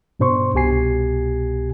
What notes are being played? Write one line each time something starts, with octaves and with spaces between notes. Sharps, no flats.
G2 B2 D4 C5 C6 C#6
C2 B2 G4 G#5 C7